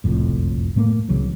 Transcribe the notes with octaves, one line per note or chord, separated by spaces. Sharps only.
F#1 C2 F2 A2
A2 A3 A#3
C2 C#3 E3 F#3